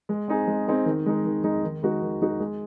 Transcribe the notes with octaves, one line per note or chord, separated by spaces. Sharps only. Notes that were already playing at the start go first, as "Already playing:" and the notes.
G#3
C4 D#4 G#4
G#3
C4 D#4 G#4
D#3
G#3 D#4
D#3
G#3 D#4
D#3
G#3 D#4 F#4
D#3
G#3 D#4 F#4
G#3